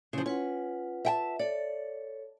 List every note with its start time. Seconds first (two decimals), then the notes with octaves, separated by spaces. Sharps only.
0.13 C#3 F3 E4 C6
0.26 C#4 F4 B4 F#5
1.05 E5 G5 A5
1.39 A4 C#5 D5